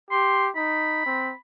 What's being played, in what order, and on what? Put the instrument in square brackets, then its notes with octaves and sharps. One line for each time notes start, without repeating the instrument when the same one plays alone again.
[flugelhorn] G4 [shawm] C6
[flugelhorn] D#4 [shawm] B5
[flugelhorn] C4